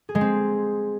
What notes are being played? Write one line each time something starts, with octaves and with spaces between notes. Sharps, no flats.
G#4
G#3
C4